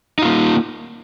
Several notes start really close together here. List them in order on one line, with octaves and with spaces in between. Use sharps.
D#4 F4 A#3